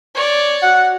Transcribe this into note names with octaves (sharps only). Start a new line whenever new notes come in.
C#5 D5
F#4 F#5